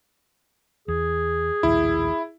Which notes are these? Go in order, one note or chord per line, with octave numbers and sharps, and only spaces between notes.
E2 G#4
A#1 D#2 A2 E4